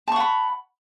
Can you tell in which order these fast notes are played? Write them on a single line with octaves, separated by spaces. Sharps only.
A5 C#6 F#5 B5